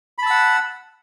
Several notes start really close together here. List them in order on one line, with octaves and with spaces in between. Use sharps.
B5 A5 E6 F#5